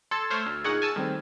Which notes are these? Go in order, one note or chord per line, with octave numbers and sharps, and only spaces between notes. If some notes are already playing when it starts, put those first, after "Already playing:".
A4 C6 E6 G#6 A6
A3 C5 C#5 F6
D2
A#2 D#4 G#4 F#5 C#6 G#6
G#5 A5 E6
D#3 G3 A3 C4